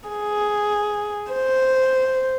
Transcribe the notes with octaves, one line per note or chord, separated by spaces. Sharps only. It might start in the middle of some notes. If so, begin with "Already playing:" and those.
G#4
C5